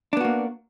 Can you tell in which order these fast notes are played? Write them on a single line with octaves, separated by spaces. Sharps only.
D4 B3 F#4 A#3